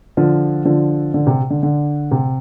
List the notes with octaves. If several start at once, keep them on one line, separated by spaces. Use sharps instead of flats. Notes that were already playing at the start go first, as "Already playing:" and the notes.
D3 F3
D3 F3
D3
C3
D3
D3
C3